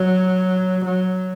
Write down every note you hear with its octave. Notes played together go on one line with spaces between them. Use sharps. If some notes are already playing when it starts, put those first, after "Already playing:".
Already playing: F#3
F#3